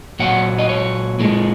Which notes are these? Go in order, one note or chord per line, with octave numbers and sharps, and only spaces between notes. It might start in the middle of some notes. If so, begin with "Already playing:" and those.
A#2 F#3 F#5
D#5
C#5
A#2 G#3